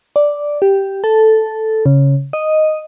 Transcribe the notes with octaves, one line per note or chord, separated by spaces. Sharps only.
D5
G4
A4
C#3
D#5